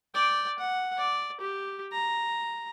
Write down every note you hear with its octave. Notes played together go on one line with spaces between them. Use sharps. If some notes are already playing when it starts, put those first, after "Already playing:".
D5 G5
F#5
D5
G4
A#5